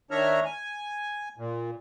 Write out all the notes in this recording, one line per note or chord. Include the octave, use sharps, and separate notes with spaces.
D#3 D4 C#5 E5 A#5 F6
G#5
A#2